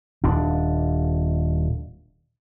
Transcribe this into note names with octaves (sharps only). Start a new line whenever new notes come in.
D#1 D4